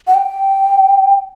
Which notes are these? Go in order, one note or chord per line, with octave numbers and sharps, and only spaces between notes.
F#5
G5